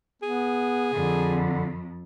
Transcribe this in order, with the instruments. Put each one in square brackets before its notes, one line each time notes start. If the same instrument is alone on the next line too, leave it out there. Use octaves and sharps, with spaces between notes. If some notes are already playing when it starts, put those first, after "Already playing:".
[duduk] B3 [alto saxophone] G#4
[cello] F2 [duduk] D3